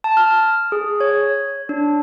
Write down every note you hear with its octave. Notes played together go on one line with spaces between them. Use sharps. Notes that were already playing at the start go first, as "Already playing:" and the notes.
A5
F6
G#4
C#5
D4